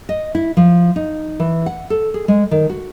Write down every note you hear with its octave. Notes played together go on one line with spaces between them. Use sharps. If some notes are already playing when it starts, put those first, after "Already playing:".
D#5
E4
F3
D#4
E3
F#5
A4
G#4
G#3
D#3
F#4